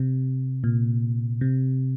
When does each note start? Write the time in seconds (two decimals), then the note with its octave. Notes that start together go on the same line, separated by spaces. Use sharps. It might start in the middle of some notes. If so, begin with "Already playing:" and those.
Already playing: C3
0.64 A#2
1.41 C3